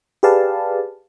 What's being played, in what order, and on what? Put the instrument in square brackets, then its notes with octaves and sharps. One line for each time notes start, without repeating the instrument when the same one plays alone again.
[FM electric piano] G4 G#4 B4 D5 F5 A5